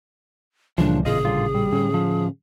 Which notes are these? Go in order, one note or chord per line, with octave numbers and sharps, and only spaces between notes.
C#2 A#2 C#3 E3 F3 G3 D4
A1 E2 A#2 C#3 F4 G#4 D#5
D3 G3 F4
G3
A2 D3 C#4
F3